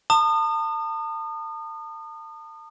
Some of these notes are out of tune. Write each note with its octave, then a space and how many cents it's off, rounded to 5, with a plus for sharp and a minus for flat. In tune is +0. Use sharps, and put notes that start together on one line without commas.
A5 +35 D#6 -30